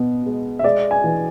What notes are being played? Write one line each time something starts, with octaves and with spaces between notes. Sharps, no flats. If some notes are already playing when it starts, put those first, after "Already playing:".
Already playing: B2 B3
G#3
E5
G#3 D5
G#5
E3